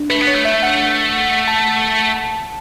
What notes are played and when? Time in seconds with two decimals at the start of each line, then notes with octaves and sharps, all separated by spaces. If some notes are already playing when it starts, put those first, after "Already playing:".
Already playing: D4
0.10 A3 B4
0.22 B3
0.27 C#5
0.35 A3
0.45 E5
0.63 F#5
1.48 A5
2.17 A5